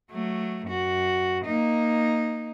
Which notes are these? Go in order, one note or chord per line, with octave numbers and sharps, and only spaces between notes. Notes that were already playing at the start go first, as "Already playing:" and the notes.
F#3 A3
F#2 F#4
A#3 D#4